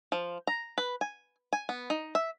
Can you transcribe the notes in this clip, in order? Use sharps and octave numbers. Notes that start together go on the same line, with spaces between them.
F3
A#5
B4
G#5
G#5
B3
D#4
E5